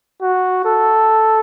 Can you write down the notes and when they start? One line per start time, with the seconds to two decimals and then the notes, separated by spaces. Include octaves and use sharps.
0.21 F#4
0.65 A4